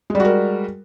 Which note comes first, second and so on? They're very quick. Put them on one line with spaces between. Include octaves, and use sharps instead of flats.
G#3 G3 F#4 A#4